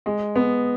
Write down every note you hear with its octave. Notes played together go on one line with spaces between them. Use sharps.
G#3
B3